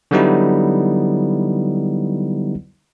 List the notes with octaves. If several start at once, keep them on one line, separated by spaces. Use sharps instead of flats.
D3 F#3 G3 B3 D#4 E4